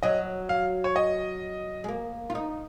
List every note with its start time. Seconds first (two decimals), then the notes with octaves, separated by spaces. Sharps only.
0.03 F#3 D#5
0.49 F5
0.84 C#5
0.96 D#5
1.84 G#3
1.88 A#3
2.30 F4
2.35 D#4